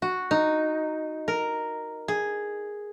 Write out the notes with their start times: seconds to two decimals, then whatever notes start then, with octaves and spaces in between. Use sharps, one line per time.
0.02 F#4
0.31 D#4
1.28 A#4
2.08 G#4